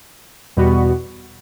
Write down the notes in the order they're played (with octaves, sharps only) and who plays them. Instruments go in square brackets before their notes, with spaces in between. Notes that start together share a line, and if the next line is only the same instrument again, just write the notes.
[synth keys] E2 B2 G3 B3 F#4